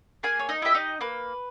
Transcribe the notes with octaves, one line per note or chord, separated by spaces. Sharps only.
A#3 G#4 G#5
C#5
D#4 D#5
E4 G4 E5
D#4 D#5
A#3 B4